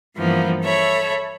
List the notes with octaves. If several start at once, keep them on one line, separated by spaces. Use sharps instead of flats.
G2 E3 F3 A#3 B3
A4 C#5 E5 B5